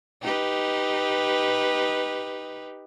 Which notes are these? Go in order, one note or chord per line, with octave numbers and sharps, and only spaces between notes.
D#4 G4 B4